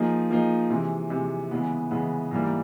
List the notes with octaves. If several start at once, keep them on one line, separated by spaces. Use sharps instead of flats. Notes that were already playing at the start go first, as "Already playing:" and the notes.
Already playing: F3 A#3 D#4 G#4
F3 A#3 D#4 G#4
C3 E3 G#3
C3 E3 G#3
C#3 E3 G#3 B3
C#3 E3 G#3 B3
G#2 E3 G3 A#3